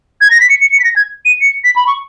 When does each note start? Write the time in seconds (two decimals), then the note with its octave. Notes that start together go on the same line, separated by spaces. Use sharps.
0.21 G#6
0.30 A#6
0.40 B6
0.49 C#7
0.61 C#7
0.73 C#7
0.80 B6
0.84 A#6
0.96 G#6
1.25 D#7
1.41 C#7
1.64 B6
1.76 B5
1.87 C#6